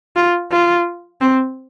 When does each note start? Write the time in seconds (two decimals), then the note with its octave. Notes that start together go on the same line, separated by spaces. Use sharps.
0.16 F4
0.52 F4
1.21 C4